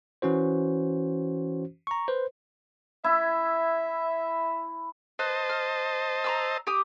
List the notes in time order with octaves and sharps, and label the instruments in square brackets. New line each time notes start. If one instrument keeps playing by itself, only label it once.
[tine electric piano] E3 C#4 F#4 C5
A#5 C#6
B4 C5
[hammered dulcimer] E4 [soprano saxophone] E5
[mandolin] B4 [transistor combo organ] C5 D#5 A5
[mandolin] F6
A#5 C6 E6
G4 D6 D#6